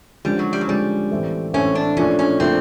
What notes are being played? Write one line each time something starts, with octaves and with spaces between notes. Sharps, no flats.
D3 F3 G3 G#3 C#4
F#3
G3
F#3
D3 F3 G3 G#3 C#4
A2 E3 A3 C4
A2 E3 A3 C4 C#4
D4
A#2 F3 A3 C#4 D4
C#4
A#2 F3 A3 C4 D4